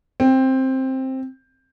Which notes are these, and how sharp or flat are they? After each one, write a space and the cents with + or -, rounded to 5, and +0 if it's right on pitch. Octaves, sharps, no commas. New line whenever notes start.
C4 +10